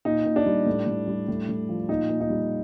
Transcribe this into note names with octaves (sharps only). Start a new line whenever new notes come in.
A#2 D#4
A#2
D4
G3
A2
A2
G3
A2
A2
F3
A#2 D#4
A#2
D#4
G3